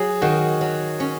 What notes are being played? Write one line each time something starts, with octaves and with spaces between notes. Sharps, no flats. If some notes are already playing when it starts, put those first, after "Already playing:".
Already playing: F#3 G#4
D#3 F#4
F#3
C#4